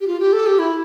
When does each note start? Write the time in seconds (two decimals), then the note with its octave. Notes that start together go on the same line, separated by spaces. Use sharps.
0.01 G4
0.07 F4
0.20 G4
0.33 A4
0.46 G4
0.59 E4